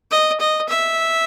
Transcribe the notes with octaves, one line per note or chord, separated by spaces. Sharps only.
D#5
D#5
E5